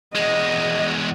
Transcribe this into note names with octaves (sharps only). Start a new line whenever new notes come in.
E2 G#3 D#5